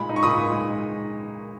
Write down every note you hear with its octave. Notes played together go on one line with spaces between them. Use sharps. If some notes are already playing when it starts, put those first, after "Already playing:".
Already playing: A#2 G#3 B5
D#4
C#6
A#2 B5 D#6
A#2
G#3